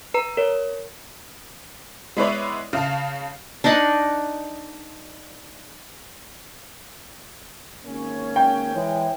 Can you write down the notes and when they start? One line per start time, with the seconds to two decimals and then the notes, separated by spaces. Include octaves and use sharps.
0.14 B4 A#5
0.37 A#4 C#5
2.17 G#3 B3 E4 B4 C#5 D5
2.73 C#3 F5 A5
3.64 D4 D#4 D#5 F#5
7.85 G#1 A#3 C#4
8.36 G5
8.75 E3 G#3 C#5